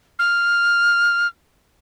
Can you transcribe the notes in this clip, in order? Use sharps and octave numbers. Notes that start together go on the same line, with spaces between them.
F6